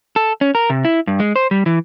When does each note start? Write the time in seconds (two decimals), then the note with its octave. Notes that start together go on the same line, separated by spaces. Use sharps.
0.16 A4
0.41 C#4
0.55 A#4
0.70 C3
0.85 E4
1.07 G2
1.20 G#3
1.36 C5
1.51 G3
1.66 E3